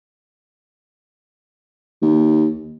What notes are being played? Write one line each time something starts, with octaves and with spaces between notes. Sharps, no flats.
D#2